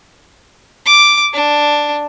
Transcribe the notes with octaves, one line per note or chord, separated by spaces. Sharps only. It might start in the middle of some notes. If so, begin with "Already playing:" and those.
D6
D4